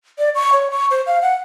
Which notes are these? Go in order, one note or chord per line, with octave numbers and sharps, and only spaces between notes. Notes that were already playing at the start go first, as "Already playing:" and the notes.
D5
C#6
C#5
C#6
C5
F5
F#5